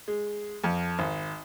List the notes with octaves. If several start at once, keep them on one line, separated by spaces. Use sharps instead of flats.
G#3
F2
G#1